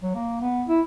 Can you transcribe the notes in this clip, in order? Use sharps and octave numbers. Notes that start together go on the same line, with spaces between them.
F#3
A#3
B3
E4